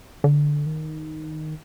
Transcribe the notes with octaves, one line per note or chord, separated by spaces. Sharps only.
D3
D#3